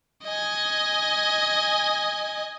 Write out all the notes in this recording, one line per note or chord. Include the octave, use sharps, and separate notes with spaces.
D#5 G#5